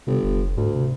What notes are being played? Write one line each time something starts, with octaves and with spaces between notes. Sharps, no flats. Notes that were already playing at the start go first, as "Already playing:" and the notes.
G1 C3
F1
D2 G#2
C3